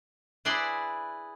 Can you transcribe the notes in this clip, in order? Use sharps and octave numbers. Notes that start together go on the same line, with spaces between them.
E4 G#4 B4 D5 B5 C6